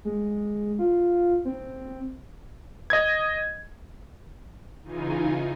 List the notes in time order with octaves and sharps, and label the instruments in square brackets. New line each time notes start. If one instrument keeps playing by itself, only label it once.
[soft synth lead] G#3
F4
C4
[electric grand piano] D#5 G#6
[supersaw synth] C#3 E3 D#4 F4 G#5